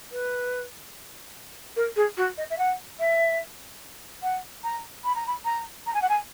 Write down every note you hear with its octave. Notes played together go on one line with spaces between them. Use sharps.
B4
A#4
G#4
F#4
D#5
E5
F#5
E5
F#5
A#5
B5
A#5
B5
A#5
A#5
G#5
F#5
G#5